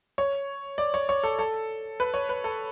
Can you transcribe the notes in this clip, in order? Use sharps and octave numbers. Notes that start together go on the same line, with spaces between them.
C#5
D5
C#5
C#5
A4
A4
B4
C#5
B4
A4